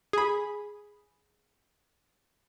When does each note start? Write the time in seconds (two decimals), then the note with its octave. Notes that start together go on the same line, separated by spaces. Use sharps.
0.13 G#4 B5